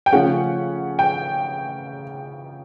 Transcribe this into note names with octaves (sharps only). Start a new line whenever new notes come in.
G5
C#3 F3 A3 C#4 F#5
G5